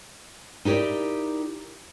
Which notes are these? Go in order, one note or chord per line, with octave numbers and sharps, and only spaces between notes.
D#4 E4 G4 A#4 D5